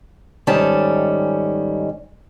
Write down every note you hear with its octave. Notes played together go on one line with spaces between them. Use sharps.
G#2 D#3 G3 C#4 A4 A5